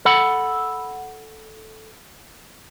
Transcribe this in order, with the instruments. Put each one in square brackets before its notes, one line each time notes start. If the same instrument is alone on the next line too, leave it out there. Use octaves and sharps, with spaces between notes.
[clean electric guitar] A4 F#5 B5